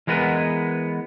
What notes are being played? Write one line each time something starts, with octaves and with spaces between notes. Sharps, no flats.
E3 G#3 B3 A#4 B4